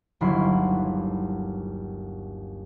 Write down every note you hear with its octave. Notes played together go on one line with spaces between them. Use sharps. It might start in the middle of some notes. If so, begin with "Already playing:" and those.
G1 D#2 F#3 E4 B5 C6